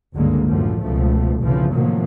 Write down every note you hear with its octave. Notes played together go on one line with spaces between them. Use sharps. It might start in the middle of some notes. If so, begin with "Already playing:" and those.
F#1 C#2 G2 D3 G#3 A#3
F#2 A2 D3 E3 F3
C#2 B2 F3 A3
F1 B1 C#3 E3 F3
A2 C3 D#3 F3 F#3 A#3